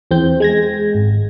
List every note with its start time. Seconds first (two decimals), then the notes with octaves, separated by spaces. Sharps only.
0.11 E2 C4 G6
0.40 G#3 G#6 A#6
0.95 G#1